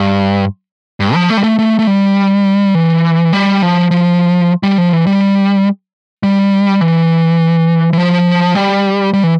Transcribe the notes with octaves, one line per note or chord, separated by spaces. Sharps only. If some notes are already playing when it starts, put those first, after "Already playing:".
Already playing: G2
G2
F3
A3
G3
A3
A3
A3
G3
E3
G3
F3
F3
G3
F3
E3
G3
G3
E3
E3
F3
G3
G3
E3